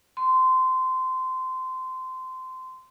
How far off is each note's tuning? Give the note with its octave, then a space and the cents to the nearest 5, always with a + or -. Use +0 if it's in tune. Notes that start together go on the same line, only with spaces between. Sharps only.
C6 -20